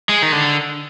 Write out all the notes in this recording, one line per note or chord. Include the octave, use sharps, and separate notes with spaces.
G#3
D#3
D3